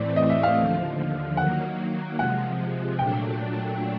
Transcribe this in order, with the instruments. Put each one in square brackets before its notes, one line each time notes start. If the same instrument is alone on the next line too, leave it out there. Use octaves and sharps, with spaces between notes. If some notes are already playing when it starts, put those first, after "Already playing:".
Already playing: [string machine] A2 E3 A3 C4 [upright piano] D5
[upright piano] D#5
E5
F5
[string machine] D#2 D3 F3
[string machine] D#3 F#3 A#3 [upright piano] F#5
[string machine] C3 F3 G#3 [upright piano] F#5
[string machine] A#2 F#3 A3 D4 [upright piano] G5